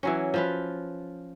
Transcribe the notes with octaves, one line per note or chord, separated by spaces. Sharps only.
E3 F#3 C#4
F3 F4 B4